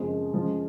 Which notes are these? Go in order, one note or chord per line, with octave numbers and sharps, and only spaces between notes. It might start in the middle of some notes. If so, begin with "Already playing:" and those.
Already playing: F#2 C#3 F3 G#3 C4
C#3 F3 G#3 C#4